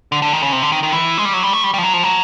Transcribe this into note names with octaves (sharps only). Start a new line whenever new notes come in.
D3
D3
D#3
C#3
C3
D3
D#3
D#3
E3
G#3
G3
F#3
G3
A3
G3
G3
F3
F#3
F3
F#3